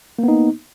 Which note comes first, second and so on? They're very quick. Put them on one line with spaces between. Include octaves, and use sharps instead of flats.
A#3 B3 D#4